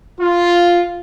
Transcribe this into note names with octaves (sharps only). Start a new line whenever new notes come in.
F4